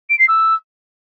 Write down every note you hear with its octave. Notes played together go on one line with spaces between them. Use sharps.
D7
C7
E6